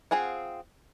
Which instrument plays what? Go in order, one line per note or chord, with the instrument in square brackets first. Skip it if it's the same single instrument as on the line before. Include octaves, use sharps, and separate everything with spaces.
[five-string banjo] C4 F4 G#4 F#5